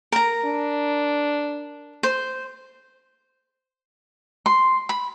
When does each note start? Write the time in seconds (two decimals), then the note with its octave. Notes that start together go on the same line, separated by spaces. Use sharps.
0.12 A#4 A#5
0.45 D4
2.03 C5
4.46 C6
4.89 B5